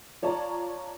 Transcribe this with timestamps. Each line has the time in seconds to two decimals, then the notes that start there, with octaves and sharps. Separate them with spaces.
0.22 F4 C#5 D5 A5 A#5